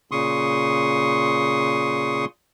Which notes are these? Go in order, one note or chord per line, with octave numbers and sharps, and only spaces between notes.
A#2 C#3 C6 C#6 D#6